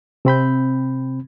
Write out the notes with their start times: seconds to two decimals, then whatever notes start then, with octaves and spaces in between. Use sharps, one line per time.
0.25 C3 C4 B5 G6